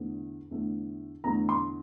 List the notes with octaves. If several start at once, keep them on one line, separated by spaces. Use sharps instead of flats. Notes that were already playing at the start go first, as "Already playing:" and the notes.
Already playing: E2 D3 A3
E2 D3 A3
E2 D3 A3 A#5
C6